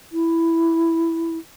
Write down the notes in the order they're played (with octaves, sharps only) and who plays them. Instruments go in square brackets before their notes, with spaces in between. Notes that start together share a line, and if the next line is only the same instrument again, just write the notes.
[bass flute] E4